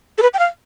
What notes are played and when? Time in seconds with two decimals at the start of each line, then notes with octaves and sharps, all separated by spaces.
0.18 A4
0.22 B4
0.34 G5
0.39 F5